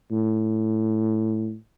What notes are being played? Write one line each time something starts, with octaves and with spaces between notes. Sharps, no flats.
A2